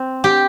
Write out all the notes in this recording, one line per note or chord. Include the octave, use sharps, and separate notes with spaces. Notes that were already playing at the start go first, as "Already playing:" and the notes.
Already playing: C4
G4